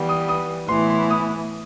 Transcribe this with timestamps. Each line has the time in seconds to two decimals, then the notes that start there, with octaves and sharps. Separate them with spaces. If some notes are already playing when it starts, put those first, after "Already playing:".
Already playing: E3 G3 B3
0.09 D#6
0.29 D#6
0.69 A2 E3 B3 E4 C6
0.90 C6
1.10 D#6